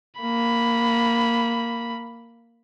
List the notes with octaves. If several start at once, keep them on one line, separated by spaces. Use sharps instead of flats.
A#3 B5